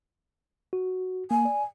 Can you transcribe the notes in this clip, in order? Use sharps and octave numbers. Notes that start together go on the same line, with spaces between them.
F#4
A#3 G#5
D5